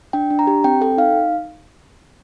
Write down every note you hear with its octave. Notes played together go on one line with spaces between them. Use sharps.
D4 G5
D4
A#5
G4
C4 G5
A4 G5
D#4 F5